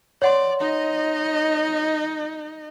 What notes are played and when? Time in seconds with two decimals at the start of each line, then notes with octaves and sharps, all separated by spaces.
0.22 C#5 D5 F#5 C6
0.60 D#4 D#5